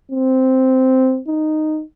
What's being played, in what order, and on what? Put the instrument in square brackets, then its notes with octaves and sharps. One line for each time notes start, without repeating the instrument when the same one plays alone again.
[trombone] C4
D#4